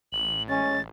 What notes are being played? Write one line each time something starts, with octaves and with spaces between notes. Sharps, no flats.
A1 F#7
G#3 C#4 A6